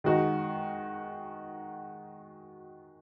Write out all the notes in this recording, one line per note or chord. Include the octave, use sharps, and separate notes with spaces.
D#3 G#3 D#4 F#4